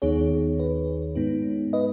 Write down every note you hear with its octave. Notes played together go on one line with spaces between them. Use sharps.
D#2 D#3 B3 D#4 G#4 C#5
B4
G#2 G#3 B3 D#4
B4 D#5